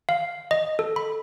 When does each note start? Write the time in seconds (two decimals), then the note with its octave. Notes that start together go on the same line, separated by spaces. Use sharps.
0.09 F5
0.51 D#5
0.79 A4
0.96 B5